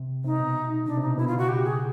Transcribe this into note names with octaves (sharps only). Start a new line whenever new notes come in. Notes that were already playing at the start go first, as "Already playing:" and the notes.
Already playing: C3
C3 D#4
B2
C3 D4
C3
D#4
B2
B2 E4
F4
C#3 F#4
G4
G#4